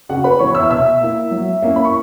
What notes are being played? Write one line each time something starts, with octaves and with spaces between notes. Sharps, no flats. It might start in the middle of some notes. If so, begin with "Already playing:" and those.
C#3 F#4 F#5
B4 B5
E3 B3 C#5 C#6
E5 E6
B2 E5 E6
A#3 E4
F#3
A#3 C#4 E4
B5
C#6